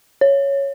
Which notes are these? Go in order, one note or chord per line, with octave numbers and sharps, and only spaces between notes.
C#5